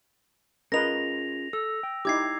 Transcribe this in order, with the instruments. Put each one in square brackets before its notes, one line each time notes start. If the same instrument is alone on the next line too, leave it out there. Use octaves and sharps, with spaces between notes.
[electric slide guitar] C#4 F4 G#4 [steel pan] A#4 B4 D#5 [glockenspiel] A#6 F7
[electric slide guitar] A4 [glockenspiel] E6
[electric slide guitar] G5
[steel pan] D#4 E4 G4 [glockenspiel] D6 G#6 C7